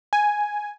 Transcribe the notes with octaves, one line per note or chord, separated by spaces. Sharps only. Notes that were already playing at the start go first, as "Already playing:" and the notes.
G#5